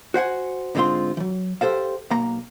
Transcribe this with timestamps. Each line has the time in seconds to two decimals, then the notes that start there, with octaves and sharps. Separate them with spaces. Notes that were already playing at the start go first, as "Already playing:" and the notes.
0.14 F#4 C5 F#5 G#5
0.75 G#2 D3 G#3 C4 F4 C6
1.17 E3 F#3
1.61 G4 A4 C5 F5
2.11 B1 A#3 A#5